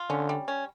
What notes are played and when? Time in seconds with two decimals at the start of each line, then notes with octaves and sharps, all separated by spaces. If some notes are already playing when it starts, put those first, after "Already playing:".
Already playing: F4
0.09 D3 C#4
0.29 G3
0.48 C#4